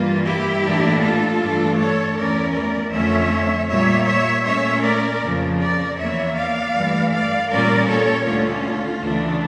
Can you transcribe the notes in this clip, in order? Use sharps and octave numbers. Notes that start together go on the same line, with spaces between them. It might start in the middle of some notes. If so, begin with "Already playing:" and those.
Already playing: G2 E3 G3 A#3 F4
E4 G4
A2 E3 A#3 D4
F4 A4
G2 E3 A3 D4
A4 C#5
E2 E3 A3 C#4 A#4 D5
A#4 D5
F2 D3 F3 A3 C#4 C#5 E5
A#2 G3 A#3 C#5 E5
C#5 E5
A#2 A3 C#4 C#5 E5
A#4 D5
F2 C#3 F3
A#4 D5
E2 E3 A#3 C#5 E5
D5 F5
G2 E3 A3
D5 F5
A#2 G3 C#4 A#4 D5
A4 C#5
D2 D3 A3 C#4 F4
D2 C#3 E3 A3 D4